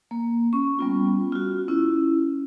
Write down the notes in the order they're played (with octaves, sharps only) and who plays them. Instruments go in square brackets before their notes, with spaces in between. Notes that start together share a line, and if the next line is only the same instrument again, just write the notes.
[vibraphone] A#3
[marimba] C#4 [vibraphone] C#6
[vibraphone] G3 B3 F4
F4 F#4
[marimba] C#4 [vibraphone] E4